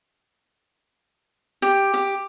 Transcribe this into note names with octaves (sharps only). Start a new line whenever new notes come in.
G4
G4